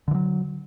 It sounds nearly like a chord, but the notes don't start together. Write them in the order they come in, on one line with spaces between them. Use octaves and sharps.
D3 E3 F#3